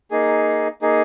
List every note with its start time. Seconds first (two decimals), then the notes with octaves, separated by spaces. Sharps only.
0.11 A#3 D#4 G#4
0.82 A#3 D#4 G#4